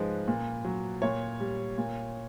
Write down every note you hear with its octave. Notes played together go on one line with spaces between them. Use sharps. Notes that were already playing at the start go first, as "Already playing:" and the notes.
Already playing: G#2 F3 G#3 B4
A#2
F#3
A#2 C#5
G3
A#2